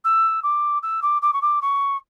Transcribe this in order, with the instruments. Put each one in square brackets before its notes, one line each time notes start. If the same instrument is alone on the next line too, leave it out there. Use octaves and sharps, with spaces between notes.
[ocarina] E6
D6
E6
D6
D6
C#6
D6
C#6